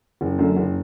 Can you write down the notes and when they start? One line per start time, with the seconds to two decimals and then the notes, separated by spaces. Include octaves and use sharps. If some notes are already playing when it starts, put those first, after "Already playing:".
0.21 F#1
0.39 F#2 D3
0.57 F#1